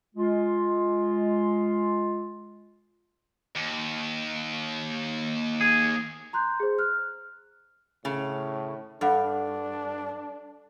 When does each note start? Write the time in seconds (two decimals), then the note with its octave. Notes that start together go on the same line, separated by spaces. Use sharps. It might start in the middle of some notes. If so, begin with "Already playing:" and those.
0.15 G#3 F4
3.56 D#2
5.61 G#4
6.33 A#5 C6 F#6 G6
6.60 G#4 C5
6.79 F6 F#6
8.05 A2 C#3
9.01 G2 D4 A4 F#5